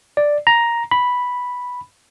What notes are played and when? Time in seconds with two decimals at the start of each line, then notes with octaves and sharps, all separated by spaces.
0.17 D5
0.47 A#5
0.91 B5